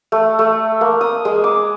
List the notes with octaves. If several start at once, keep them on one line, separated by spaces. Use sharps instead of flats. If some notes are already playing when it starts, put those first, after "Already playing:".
A3
A3
A#3
D#6
G#3
D6